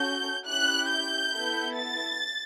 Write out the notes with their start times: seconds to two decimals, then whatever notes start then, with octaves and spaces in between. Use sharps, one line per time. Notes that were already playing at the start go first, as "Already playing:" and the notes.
Already playing: C#4 F#4 A4 G6
0.45 C#4 E4 G4 F#6
0.89 G6
1.32 B3 E4 A4
1.76 A6